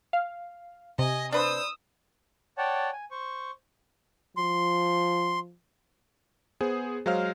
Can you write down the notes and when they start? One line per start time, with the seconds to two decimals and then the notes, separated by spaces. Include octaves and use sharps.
0.13 F5
0.99 C3 D#5 G#5
1.32 D4 B4 C5 D#6 E6
2.58 C#5 D5 F#5 G5 A5
2.93 G#5
3.11 C5 C#6
4.37 F3 C6
6.61 B3 G#4 C5
7.06 F#3 G#3 C5 F5 F6